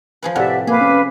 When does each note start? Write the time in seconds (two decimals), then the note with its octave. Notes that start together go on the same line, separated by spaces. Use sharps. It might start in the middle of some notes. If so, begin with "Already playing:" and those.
0.23 F3 G#4 B4
0.35 A2 C3 G4 D5 E5 F#5
0.67 A#3 G#4 B4 F5 D6
0.81 C#4